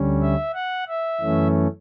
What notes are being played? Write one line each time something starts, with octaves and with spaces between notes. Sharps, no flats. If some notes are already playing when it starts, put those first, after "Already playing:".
Already playing: D2 D3 G3 C#4
E5
F#5
E5
F#2 E3 A3 C#4